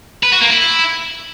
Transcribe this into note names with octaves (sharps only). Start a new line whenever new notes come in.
B4
F#4
A#3
E4